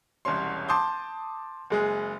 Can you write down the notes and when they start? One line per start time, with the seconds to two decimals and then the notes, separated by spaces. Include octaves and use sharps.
0.25 E1 C2 C#4 C#5 C6
0.69 A5 C6 D6 D#6 G6
1.70 F#1 G#3 G#4